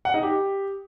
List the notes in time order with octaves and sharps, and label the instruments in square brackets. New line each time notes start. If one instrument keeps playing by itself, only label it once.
[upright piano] F#5
D#4
G4